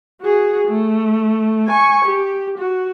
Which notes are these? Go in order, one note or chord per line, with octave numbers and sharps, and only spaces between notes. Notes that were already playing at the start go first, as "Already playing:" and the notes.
F#4 G#4
A3
G#5 C#6
G4
F#4